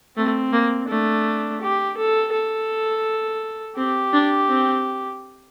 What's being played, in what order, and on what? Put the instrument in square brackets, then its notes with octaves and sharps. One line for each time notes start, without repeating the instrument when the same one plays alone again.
[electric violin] A3 [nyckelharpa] C4
[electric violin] A#3
[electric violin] A3 [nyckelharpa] D4
[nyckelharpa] G4
A4
A4
[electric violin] C4 [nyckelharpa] G4
[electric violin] D4
C4